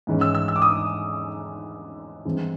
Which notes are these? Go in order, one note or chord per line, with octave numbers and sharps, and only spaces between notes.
G#2 E3 G#3 C#4
E6
E6
E6
D6
D#6
G2 E3 G#3 C4